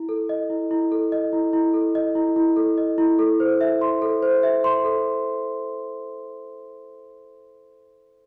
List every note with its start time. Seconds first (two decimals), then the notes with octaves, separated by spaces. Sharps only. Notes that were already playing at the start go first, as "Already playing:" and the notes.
Already playing: E4
0.09 A4
0.29 D#5
0.50 E4
0.71 E4
0.92 A4
1.12 D#5
1.33 E4
1.53 E4
1.74 A4
1.95 D#5
2.15 E4
2.36 E4
2.56 A4
2.78 D#5
2.98 E4
3.19 A4
3.40 C5
3.61 E5
3.81 C6
4.02 A4
4.23 C5
4.43 E5
4.64 C6
4.84 A4